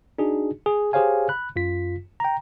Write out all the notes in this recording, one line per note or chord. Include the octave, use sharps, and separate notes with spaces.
D4 D#4 F#4 G#4
G#4
G4 G#4 C5 C#5 F5 G#5
B5 F#6
F#2 F4 B6
G5 A#5